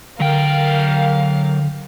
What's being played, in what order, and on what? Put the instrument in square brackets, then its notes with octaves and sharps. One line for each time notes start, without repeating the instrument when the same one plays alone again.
[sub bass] D3 [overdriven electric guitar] F#3 G5 [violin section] A#4 F5